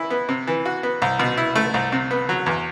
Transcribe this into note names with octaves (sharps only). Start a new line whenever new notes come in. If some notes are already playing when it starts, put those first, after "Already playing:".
Already playing: E3 E4
B3
C3
E3
F#4
B3
C2
B2
E4
A3
C2
C3
B3
F#3
E2